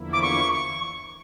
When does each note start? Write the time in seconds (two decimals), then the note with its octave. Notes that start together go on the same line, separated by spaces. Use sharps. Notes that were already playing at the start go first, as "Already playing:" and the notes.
Already playing: E2 D3 F3 A#3 E4
0.13 D6
0.22 C#6
0.53 C#6